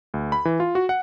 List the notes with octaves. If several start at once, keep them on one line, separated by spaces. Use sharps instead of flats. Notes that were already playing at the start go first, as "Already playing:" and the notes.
D2
B5
E3
F4
F#4
F#5